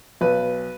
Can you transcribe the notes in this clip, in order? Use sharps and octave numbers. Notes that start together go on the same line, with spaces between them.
B1 B4